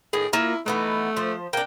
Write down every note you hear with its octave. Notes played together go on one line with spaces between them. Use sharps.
A2 D#3 G#4
A#3 E4 F4 A#5
E3 A3 B3 D#4
F3 C5
A#3 D4 G5